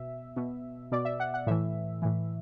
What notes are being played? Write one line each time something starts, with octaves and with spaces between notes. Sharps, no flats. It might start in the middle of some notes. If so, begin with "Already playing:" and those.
Already playing: B2 E5
B2
B2 D5
E5
F#5
F#5
A2 E3 E5
A2 E3